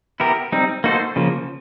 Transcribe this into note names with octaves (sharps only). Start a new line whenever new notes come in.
B3 E4 G4 A#4
G3 C4 D#4
A#3 D#4 F#4 A4 C5
C#3 F3 A#3